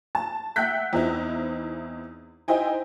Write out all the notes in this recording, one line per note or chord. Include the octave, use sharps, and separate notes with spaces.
A5
E5 F#5 G5 F#6 G6 B6
E2 E3 C4 D#4 E4
D#4 E4 C5 D#5 G5 G#5